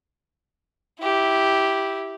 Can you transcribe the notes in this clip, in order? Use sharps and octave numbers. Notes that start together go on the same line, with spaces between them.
E4 G4